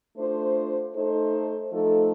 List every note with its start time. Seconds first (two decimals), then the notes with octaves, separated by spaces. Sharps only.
0.16 A3 D4 F4 C5
0.94 A3 D#4 A4 C5
1.71 F3 A3 D#4 A4